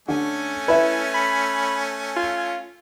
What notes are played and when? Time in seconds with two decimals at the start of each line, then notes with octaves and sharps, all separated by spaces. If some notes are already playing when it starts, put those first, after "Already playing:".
0.08 D3 A3 C#4 G#5
0.68 E4 B4 E5
1.14 B5
2.16 F4